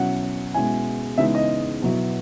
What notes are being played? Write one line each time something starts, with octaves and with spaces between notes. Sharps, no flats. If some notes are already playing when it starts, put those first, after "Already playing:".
Already playing: B2 F#3 C#4 E4 F#5
B2 G#3 C#4 E4 G#5
C#3 E3 G#3 B3 D#4 E5
D#5
B2 F#3 B3 E4